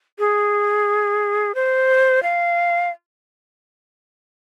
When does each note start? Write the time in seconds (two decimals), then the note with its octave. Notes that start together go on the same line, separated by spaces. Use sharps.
0.19 G#4
1.55 C5
2.23 F5